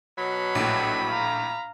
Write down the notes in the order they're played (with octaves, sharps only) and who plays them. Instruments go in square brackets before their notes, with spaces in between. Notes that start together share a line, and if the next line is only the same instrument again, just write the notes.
[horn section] B2 F#3 [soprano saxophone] B5
[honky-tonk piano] A#1 A2
[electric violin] F5 A#5